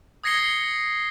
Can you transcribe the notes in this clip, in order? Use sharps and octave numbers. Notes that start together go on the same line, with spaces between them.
D#6 G#6 A#6 C7 C#7 G7